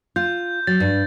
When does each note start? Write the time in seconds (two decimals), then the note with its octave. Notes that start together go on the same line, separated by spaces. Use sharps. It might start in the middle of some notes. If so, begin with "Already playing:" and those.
0.16 F4 G6
0.67 F#3 A6
0.80 G2